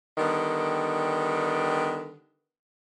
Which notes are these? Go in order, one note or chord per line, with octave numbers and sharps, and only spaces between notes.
D3 D#3 G3 B3